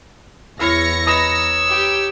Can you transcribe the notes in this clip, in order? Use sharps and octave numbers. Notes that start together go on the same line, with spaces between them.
E2 E4 C#5 F5 A#6 C#7
B4 C#5 D#5 A#5 E6
G4